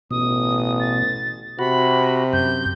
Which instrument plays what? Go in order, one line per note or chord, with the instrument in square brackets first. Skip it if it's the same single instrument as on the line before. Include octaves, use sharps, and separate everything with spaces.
[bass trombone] A1 [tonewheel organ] B2 [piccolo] D#6
[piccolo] A6
[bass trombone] C3 [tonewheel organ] F#4 [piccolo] B5
[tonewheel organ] F#2 [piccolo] G6